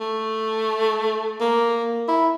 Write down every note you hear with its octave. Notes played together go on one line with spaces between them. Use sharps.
A3
A#3
E4